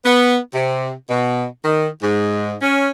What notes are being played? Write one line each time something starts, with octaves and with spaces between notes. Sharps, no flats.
B3
C3
B2
D#3
G#2
C#4